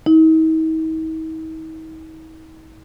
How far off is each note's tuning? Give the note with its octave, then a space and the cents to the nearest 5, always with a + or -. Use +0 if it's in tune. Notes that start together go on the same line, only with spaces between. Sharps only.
D#4 +45